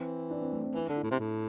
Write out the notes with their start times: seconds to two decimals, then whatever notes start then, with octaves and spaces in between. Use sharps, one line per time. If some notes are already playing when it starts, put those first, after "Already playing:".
Already playing: E3 C4
0.31 D4
0.41 C4
0.53 A3
0.64 C4
0.74 E3 D4
0.89 D3
0.96 E4
1.03 A2
1.11 C3
1.19 A2